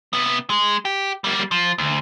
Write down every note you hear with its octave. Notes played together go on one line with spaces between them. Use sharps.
C3 B3
G#3
G4
G3 A#3
F3
D2